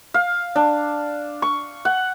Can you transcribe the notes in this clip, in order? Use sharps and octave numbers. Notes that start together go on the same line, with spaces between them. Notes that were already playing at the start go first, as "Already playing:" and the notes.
F5
D4
C#6
F#5